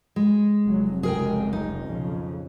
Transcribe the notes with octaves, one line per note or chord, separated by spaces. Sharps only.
G#3
F1 F#3
C#2 F#2 G#3 G#4 A#4 G5
D#4
B1 F2 C#3